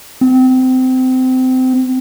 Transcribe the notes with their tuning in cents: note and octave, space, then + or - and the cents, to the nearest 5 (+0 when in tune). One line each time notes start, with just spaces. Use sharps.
C4 -25